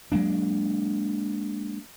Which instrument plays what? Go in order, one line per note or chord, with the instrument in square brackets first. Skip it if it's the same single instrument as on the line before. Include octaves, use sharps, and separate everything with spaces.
[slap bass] F#3 G#3 A#3 D4